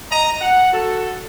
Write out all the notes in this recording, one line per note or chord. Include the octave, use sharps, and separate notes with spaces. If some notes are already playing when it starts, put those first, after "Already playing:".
D#5 A#5
F#5
F#4 A4